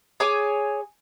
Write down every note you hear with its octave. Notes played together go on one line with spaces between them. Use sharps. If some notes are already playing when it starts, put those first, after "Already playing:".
G#4 C#5 G#5 D6